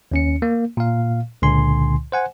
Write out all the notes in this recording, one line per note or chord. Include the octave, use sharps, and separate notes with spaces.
D#2 C#4 C#7
A#3
A#2 F5
C#2 A#2 D3 G#5 C6
C5 F#5 G#5